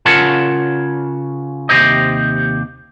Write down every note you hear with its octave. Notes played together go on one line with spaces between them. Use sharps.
C#3 F4 A#4 C#5 F#5 A5
D#2 C3 G4 C5 D#5